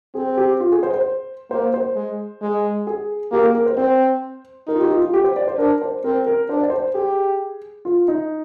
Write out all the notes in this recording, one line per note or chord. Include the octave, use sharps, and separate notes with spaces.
C4 G#4
G4
F4
G#4
C5
C5
A#3 C5
C5
G#3
G#3
G#4
A#3 G4
A#4
G#4
A#4
C5
C4 C5
D#4 A#4
F4
G4
F4
F4
G4
C5
D5
C5
D4 A#4
C5
C4 A#4
A#4
D4 C5
D5
C5
G4 G#4
F4
D#4